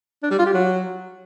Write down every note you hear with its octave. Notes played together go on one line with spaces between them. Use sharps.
D4
G3
F4
G4
F#3